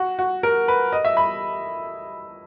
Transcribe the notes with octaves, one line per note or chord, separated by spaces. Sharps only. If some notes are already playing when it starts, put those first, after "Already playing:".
Already playing: F#4
F#4
A#4
B4
D#5
E5
B5